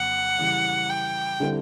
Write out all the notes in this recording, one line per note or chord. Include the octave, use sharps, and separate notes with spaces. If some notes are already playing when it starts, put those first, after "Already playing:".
Already playing: F2 C#3 F#3 B3 F#5
C#3 E3 G3
G5
D3 G3 C4 E4 A4